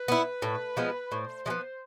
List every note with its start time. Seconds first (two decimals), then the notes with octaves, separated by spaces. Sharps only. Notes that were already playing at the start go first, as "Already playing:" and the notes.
Already playing: B4
0.08 B3 E4
0.42 A2
0.77 F3 G#3 B3
1.11 A2 C5
1.46 F3 G#3
1.50 B3